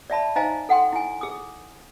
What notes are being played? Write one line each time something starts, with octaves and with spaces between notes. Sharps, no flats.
D5 E5 A5 B5
D#4 C5 D#5 F5 G#5 A#5
A4 F#5 G5 C6
E4 G#5
G#4 D#6